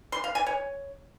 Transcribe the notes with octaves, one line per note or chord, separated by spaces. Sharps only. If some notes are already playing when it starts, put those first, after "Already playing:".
C6
F5
G#5
C#5